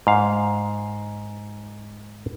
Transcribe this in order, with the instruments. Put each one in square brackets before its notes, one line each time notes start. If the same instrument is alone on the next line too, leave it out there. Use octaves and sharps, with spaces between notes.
[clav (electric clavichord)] G#2 F5